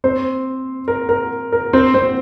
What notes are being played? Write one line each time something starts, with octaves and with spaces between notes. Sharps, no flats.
C4 C5
A#4
A#4
A#4
C4 C5
C4 C5